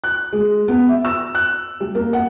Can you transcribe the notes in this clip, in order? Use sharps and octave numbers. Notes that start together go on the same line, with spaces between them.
F#6
G#3
B3
E5
E6
F#6
G3
A#3
F#5